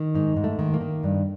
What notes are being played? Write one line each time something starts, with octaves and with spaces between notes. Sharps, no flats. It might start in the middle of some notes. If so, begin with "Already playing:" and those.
Already playing: D#3
G#2 D#4
G#2
A3
D#3
A#3
D#3
G2